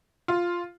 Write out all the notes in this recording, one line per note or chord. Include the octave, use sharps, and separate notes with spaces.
F4